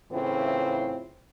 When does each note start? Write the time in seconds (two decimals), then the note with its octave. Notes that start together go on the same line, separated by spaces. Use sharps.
0.11 A2 C#3 E3 C4 E4 F4